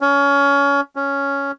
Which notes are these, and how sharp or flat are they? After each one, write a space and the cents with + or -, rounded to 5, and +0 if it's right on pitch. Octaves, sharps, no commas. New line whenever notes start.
C#4 +25
C#4 +5